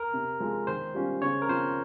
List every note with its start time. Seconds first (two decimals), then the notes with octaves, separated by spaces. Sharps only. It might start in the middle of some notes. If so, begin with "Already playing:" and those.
Already playing: A#4
0.14 C3
0.40 F3 G#3
0.67 D#3 C5
0.94 G3 C#4 F4
1.22 C#3 C#5
1.42 A#4
1.49 F3 C4 C5